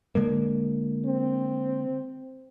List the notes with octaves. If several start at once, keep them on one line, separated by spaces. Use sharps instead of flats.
D3 G#3 A#3
C4